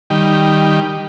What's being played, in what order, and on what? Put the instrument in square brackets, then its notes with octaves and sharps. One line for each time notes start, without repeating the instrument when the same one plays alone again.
[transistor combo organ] D#3 G3